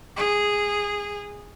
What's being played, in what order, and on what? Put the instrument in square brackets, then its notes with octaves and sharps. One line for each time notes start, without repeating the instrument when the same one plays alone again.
[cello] G#4